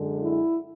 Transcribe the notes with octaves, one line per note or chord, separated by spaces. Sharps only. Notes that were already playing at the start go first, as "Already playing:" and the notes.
Already playing: F#2 D3 G#3
E4